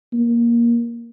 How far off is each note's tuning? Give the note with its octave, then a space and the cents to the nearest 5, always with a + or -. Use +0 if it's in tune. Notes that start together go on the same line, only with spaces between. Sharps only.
A#3 +15